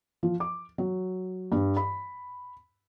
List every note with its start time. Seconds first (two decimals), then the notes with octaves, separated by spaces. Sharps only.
0.23 F3
0.40 D6
0.78 F#3
1.52 G2
1.77 B5